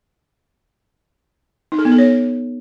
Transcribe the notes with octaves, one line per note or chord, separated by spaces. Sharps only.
D#4
A4
B3
A4
C#5